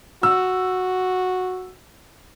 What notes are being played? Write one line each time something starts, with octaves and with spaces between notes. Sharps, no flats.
F#4 E6